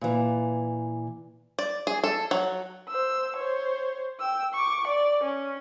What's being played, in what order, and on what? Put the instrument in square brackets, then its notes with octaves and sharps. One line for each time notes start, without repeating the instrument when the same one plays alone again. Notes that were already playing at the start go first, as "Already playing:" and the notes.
[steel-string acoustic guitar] A#2 E3
[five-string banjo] D5
G#4
A4
F#3
[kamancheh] C5 E6
C5 C#5
G5 E6
C#6 D6
D5
C#4